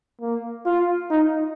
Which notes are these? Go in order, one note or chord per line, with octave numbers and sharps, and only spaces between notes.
A#3
F4
D#4